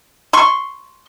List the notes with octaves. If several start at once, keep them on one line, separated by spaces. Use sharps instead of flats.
C6 C#6